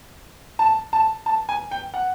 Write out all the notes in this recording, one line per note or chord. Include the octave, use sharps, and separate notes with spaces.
A5
A5
A5
G#5
G5
F#5